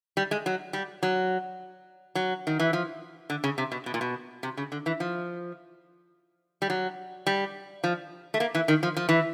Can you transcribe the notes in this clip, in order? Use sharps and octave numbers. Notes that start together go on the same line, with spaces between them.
G3
G#3
F#3
G3
F#3
F#3
D#3
E3
F3
D3
C#3
C3
B2
B2
A#2
B2
C3
C#3
D3
E3
F3
G3
F#3
G3
F3
A3
A#3
E3
D#3
F3
F3
E3